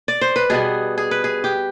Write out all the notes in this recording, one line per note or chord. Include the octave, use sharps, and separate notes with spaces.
D5
C5
B4
B2 G3 B3 G#4
G#4
B4
G#4
G4